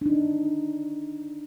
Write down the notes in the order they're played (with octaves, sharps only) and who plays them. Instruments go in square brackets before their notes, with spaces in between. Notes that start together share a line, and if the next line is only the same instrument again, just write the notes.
[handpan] D4 D#4